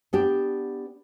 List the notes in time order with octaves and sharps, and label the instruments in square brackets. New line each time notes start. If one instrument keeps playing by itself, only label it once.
[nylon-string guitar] B3 D4 G4